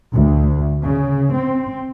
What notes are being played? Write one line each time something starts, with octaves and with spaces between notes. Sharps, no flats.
D2
C#3
C4